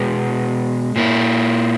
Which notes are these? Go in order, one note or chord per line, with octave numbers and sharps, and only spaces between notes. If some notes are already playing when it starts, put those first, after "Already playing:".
Already playing: B2 G#3 B3
A#2 A#3 E4